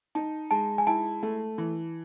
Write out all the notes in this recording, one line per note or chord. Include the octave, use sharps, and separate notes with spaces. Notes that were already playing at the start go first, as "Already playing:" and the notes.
D#4 A5
G#3 A5
G#5
E4 A5
A3
E3